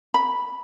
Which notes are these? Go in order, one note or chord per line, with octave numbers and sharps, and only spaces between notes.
B5